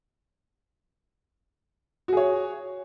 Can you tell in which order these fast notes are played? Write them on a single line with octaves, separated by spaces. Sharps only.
F#4 G#4 C#5